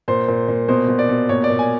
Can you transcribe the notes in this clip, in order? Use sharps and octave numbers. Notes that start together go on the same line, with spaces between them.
A#2 C5
A#2
A#2
B2 C5
B2
D5
B2
A#2 C#5
D5
A#2
G#5